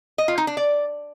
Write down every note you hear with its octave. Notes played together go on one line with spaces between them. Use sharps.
D#5
F4
D#4
D4
D5